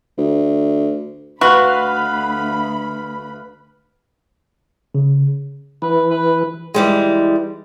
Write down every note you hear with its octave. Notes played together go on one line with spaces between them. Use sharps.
D2
D2 F#4 B4 F5 B5 C6
C#3
E3 B4
B4
E3 G3 G#3